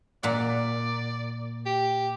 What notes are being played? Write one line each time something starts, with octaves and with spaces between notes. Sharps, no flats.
A#2 D5 F#5
G4